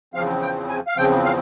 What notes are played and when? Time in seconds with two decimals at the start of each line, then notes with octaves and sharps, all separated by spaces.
0.14 E2 C#3 F3 C4 F5
0.42 G5
0.69 G#5
0.87 F5
0.97 E2 C#3 F3 C4 G5
1.24 F5